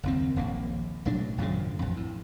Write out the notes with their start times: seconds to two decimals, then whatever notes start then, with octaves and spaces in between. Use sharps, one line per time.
0.03 F#1 D#2 C4
0.36 D#1 A#1 A#3
1.05 B1 A2 F#3 D4
1.38 G#1 F#2 A#2 C#3
1.79 A1 F2
1.97 A2